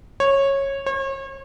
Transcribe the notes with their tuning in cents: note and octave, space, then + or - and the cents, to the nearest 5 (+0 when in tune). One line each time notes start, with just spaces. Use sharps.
C#5 -15
C#5 -40